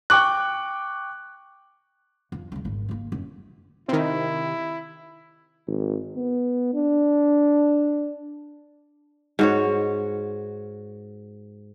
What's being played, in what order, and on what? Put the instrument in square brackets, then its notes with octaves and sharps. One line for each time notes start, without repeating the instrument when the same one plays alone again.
[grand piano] G5 C#6 D6 F#6
[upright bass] F2
C#2 G#3
G#1 A#2
D#3 A#3
F#2
[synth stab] C3 D#3 [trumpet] E4
[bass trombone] G#1
B3
D4
[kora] G#2 F#4 C#5